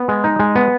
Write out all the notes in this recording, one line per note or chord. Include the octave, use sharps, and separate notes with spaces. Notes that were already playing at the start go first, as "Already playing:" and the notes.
Already playing: B3
G#3
D#4
G#3
B3